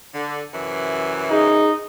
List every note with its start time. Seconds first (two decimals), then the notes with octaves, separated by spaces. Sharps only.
0.14 D3
0.54 F#2 C3 E3
1.30 D#4 G#4